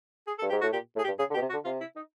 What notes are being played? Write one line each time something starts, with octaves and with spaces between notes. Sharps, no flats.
G#4
A4
G2
G#2 G4
A2 F#4
A#2 G4
A2
G#4
G4
G2
C#3 G#4
D3
B2 G4
C3
F#4
D3
C3 F4
E4
D#4